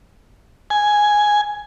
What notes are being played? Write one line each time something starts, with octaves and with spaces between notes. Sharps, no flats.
G#5